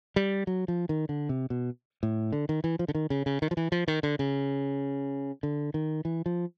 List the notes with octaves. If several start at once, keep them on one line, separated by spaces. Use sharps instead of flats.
G3
F#3
F3
D#3
D3
C3
B2
A2
D3
D#3
E3
F3
D3
D#3
C#3
C#3
D#3
F3
E3
F3
D#3
D3
C#3
D3
D#3
E3
F3